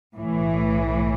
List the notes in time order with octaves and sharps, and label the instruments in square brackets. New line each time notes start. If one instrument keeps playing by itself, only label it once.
[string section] B1 A2 E3